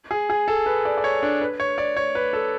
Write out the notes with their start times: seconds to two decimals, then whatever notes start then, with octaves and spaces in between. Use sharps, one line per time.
0.11 G#4
0.30 G#4
0.48 A4
0.66 B4
0.85 D5
0.97 D5
1.04 C#5
1.23 D4
1.42 B4
1.60 C#5
1.78 D5
1.96 C#5
2.15 B4
2.33 A4